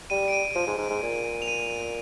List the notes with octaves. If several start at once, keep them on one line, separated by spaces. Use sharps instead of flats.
G3 D#7
D7
D#7
F3 D#7
G#2
G#2
G#2
A#2
F7
D#7